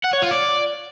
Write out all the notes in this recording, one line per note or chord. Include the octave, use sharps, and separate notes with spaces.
F#5
C#5
F4
D5